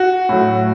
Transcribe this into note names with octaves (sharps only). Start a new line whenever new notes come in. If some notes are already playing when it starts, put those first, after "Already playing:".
Already playing: F#4
A2 F#3